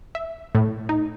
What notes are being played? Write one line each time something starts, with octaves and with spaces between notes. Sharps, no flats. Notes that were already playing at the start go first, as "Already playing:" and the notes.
E5
A2
D#4